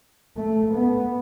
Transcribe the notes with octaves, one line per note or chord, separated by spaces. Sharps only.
A3
B3